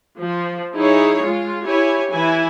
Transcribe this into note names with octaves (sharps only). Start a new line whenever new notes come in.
F3
D#4 E4 G#4 C#5
G#3 F4
E4 G4 C#5 G#5
E3 E4 G#5